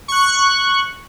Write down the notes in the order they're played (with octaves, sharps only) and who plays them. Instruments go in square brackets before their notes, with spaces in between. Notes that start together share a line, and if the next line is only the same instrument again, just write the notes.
[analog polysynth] C#6 F#6